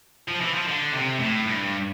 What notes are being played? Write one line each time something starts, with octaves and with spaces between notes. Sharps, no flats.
F3
E3
F3
D3
C3
A2
G2